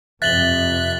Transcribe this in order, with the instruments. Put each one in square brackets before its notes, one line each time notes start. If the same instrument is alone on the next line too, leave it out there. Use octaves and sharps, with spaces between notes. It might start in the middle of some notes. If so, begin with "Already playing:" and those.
[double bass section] F2 C3 [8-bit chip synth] E5 F#6 [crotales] A6 F#7 G7